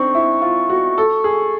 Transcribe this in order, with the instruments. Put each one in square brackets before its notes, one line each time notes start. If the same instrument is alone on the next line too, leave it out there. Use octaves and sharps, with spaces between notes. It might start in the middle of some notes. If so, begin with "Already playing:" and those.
Already playing: [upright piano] C4 D4 D#4 [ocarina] C#6
[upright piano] E4
F4
F#4
A4
G#4